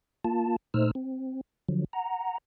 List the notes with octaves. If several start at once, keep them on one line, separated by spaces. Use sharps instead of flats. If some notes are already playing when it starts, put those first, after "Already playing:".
A#3 F4 A5
A#2 A3 D#4 C5 E6 F6
C4
D3 F3 F#3
F#5 A#5